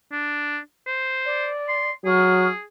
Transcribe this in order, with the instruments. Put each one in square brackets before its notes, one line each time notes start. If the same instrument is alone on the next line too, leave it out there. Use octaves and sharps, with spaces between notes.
[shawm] D4
C5
[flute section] D5
[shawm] C6
[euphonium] F#3 [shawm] G#4 [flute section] C#6 D#6 F6